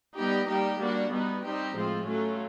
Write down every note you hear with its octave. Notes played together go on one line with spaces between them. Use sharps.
G3 B3 D#4 G4
G3 A#3 D#4 G4
G3 A#3 D4 F#4
B2 G3 B3 D#4
G3 C4 D#4 G4
A2 F3 G#3 C4 F4
F#3 A3 C#4 F4